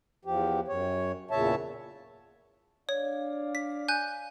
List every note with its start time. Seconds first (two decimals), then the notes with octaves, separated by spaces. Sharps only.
0.25 E2 F3 G4
0.68 F#2 C#5
1.31 E2 A#2 C#3 C#5 E5 A5
2.89 D4 C#5 D5 F5
3.55 B6
3.88 G#5 F#6 G6